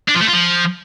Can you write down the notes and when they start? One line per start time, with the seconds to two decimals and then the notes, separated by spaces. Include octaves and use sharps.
0.09 D4
0.15 F3
0.21 A3
0.27 F4
0.34 F3